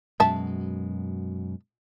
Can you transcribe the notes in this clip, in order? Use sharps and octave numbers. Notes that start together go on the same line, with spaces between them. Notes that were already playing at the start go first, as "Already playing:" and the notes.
F#2 B2 G#3 E5 A5